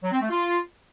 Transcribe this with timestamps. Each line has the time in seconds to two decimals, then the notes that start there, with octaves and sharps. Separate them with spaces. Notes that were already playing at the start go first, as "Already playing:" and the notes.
0.03 F#3
0.12 C4
0.21 A3
0.29 F4